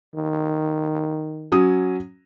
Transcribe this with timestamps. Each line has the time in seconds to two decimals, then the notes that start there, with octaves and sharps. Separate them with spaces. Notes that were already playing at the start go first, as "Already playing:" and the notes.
0.15 D#3
1.52 F#3 C#4 D#6